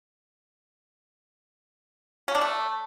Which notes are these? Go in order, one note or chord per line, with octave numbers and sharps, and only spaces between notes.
C#4
D4
A3